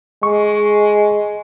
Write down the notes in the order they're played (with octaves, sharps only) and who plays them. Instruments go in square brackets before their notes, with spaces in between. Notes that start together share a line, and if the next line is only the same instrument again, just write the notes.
[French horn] G#3 [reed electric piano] C#6